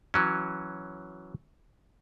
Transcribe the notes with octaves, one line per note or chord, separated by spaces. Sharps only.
E3 F#3 C#4